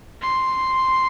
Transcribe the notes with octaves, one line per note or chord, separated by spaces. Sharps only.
C6